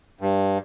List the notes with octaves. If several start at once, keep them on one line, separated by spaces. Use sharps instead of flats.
G2